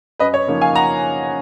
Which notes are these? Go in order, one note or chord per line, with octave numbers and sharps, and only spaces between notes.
F#2 B4 D#5
C#5
C#3 F3 A#3 D#4
F5 G#5
F#5 A#5